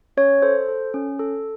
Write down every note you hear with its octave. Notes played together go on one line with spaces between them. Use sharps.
C#4 C#5
A4 C5
A4
C#4
A4